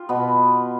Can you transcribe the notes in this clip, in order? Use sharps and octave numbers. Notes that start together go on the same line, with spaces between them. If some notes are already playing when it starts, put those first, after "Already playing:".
Already playing: F4 G4
B2 B3